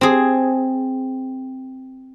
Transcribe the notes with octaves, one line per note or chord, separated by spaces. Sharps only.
C4 G#4